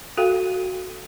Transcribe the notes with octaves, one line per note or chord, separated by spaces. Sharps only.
F#4 A4 F5 G5